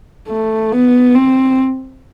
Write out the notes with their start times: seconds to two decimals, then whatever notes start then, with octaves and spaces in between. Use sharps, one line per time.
0.28 A3
0.72 B3
1.15 C4